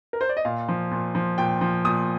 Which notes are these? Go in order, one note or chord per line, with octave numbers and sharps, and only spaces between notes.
A#4
C5
D5
D#5
A#2 F5
F3
A#2
F3
A#2 G5
F3
A#2 D#6